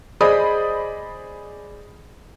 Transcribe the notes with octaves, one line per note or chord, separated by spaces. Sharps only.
G#4 C5 D5 D#5 B5 D#6